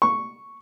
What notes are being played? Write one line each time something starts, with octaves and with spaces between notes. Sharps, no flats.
C#6